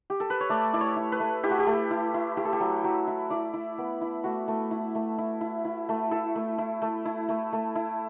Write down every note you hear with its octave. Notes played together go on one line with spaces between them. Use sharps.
G4
A4
B4
C#5
A3 D5
E4 D5
C#5
E4
B4
A3
E4 G4
F#4
G4
A3
E4
E4
E4 G4
A4
G4
F#3
F#3
E4
E4 D5
E4
B3
E4
A3 F#4
A3
E4
A3
E4
E4
E4
A3
E4 A4
A3
E4
A3
E4
A3
A3
E4